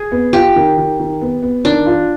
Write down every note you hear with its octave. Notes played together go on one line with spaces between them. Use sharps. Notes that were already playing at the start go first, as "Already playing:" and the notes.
Already playing: G#4
B3
F4 G4
D#3
D#3
D#3
B3
B3
D#3 D4
F4